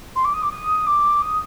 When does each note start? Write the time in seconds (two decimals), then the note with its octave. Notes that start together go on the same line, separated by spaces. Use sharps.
0.15 C6
0.24 D6
0.33 D#6
0.42 D6
0.51 D#6
0.86 D6
1.21 D#6